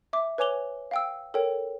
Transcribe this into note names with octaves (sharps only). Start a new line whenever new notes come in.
E5 D6
B4 C#5 G#5 D6 F7 G7
F5 G5 E6
A4 A#4 C#5 G5